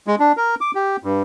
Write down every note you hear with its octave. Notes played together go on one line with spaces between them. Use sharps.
G#3
D4
A#4
D6
G4
G2